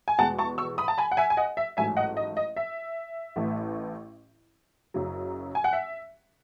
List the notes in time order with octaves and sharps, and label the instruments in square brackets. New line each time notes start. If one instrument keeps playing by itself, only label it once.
[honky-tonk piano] G#5
E2 B2 G#3 F#5 A5
A5 C#6
C#6 E6
B5 D#6
A5
G#5 B5
F#5
E5 G#5
G#5
D#5 F#5
E5
A1 G#2 F#3 A3 E5 G#5
D#5 F#5
D#5
D#5
E5
A1 A2 E3 A3
F#1 F#2 C#3 F#3
G#5
F#5
E5